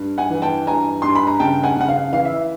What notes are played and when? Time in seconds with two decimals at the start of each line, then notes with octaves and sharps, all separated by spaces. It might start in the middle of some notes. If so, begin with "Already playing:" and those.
Already playing: G2
0.18 F#5 G#5
0.30 E3
0.42 G5 A5
0.67 G2 G#5 A#5
1.02 G2 C6
1.15 B5
1.27 A#5
1.40 C#3 G5 A5
1.63 F#5 G#5
1.77 C#3 F#5
1.89 F5
2.12 E3 F5
2.25 E5